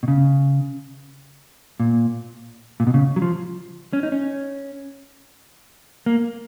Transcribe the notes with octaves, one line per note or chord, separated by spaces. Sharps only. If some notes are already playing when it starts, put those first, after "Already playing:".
B2
C#3
A#2
A#2
B2
C#3
F#3
F3
C#4
D#4
C#4
A#3